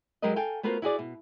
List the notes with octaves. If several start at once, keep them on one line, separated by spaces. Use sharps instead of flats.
F#3 G#3 G4 A#4 B4 D#5
A4 F5 G5 G#5
A3 B3 F4 F#4 A#4 C5
E4 F#4 G#4 D5
B2